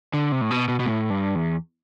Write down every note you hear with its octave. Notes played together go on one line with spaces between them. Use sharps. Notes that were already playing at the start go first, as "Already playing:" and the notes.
D3
C3
A2
B2
B2
B2
A2
G2
E2